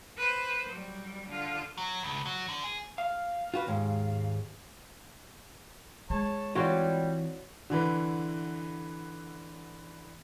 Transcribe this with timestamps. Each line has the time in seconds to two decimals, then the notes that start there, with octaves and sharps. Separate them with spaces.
0.18 B4 C5
0.69 F#3 G3
1.28 D3 F4
1.78 F#3
2.03 C#2
2.25 F#3
2.49 D3
2.64 G#4
2.98 F5
3.54 F4 F#4 B4
3.67 D#2 G#2 G#3
6.10 G#3 C#5 A5
6.55 E3 G3 C4 F4 F#4 C#5 D5
7.70 D3 E3 B4